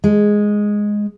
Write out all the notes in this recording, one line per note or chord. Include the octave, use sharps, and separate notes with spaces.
G#3